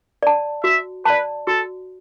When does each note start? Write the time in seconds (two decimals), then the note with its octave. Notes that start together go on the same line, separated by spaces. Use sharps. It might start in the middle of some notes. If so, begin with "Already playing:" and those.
0.23 D5 A5
0.64 F#4 E5
1.05 B4 D5 A5
1.47 F#4 A4